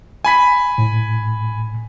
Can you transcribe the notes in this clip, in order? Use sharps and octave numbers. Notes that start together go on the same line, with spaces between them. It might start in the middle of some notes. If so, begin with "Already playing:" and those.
G#5 B5 B6
A2